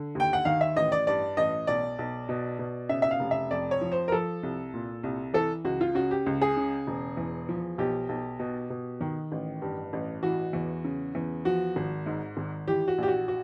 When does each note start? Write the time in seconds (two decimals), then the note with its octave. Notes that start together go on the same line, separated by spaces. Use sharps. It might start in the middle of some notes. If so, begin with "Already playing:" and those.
Already playing: D3
0.15 D#2 G5
0.33 F#5
0.45 D#3 F5
0.61 E5
0.76 A1 D#5
0.92 D5
1.07 G2 D5
1.37 A1 D#5
1.67 B1 D5
1.99 B1
2.29 B2
2.59 B2
2.89 C#3 E5
3.02 E5
3.11 F5
3.20 F1
3.31 E5
3.51 F2 D5
3.71 C#5
3.81 F3
3.92 C5
4.08 A#4
4.12 F3 A4
4.43 C2
4.74 A#2
5.03 C2
5.34 E3 A4
5.64 C#2 F#4
5.81 F4
5.95 C#3 F#4
6.11 G4
6.26 C#2
6.42 G#4
6.57 C#3
6.87 E1
7.17 E2
7.49 F3
7.78 B1 G4
8.09 B1
8.39 B2
8.70 B2
9.01 D#3
9.32 A1
9.62 G2
9.93 A1
10.23 E3 F#4
10.53 E2
10.84 C#3
11.15 E2
11.45 F3 F#4
11.76 G#1
12.06 G#2
12.37 G#1
12.68 E3 G4
12.88 F#4
12.98 A#1 G4
13.08 F#4
13.28 F#4